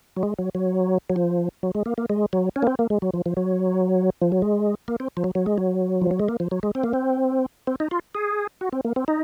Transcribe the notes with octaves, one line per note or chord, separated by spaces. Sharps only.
F#3
G#3
F#3
F#3
F#3
F3
F#3
G#3
A#3
A#3
G#3
F#3
C#4
A#3
C4
A#3
G#3
F#3
F3
F3
F#3
F3
F#3
G#3
A#3
C4
F3
F#3
F#3
G#3
F#3
F3
F#3
G#3
A#3
F3
F#3
G#3
C4
A#3
C4
C4
D#4
F4
G#4
F#4
C4
A#3
C4
D#4